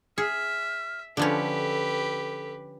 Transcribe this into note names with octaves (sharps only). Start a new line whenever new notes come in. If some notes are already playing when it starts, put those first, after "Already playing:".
G#4 E5 F6
D3 F3 C#4 G4 A4 B4